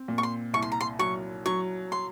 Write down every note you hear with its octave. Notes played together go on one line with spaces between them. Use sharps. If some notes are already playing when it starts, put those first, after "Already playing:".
Already playing: C4
A#2
C#6
C6
C2 C#6
C6
A#5
C6
F#3 C#6
F#3 C#6
C6